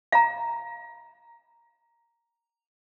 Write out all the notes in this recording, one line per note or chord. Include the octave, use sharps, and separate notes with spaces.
F5 A#5